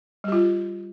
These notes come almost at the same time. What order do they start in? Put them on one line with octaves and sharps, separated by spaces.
G3 G4 F4